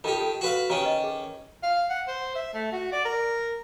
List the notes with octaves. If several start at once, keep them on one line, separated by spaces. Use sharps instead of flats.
D#3 F4 G4 A4 A5
A4
F#4 B4 F5
D#3 C#4 G4 B4 A#5
D#5
G#4
F5
F#5
C5
E5
A3
F#4
D5
A#4